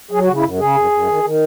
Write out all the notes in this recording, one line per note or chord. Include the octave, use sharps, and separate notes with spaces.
F#3 G#4
F#4
C#3
E4
F#2
C#3 G#4
F#2
F#2
D#3
D#3